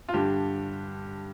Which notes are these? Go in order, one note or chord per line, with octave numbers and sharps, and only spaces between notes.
F4
G2 D3 G4